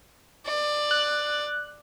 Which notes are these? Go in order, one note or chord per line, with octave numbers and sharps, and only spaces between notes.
D5
F#6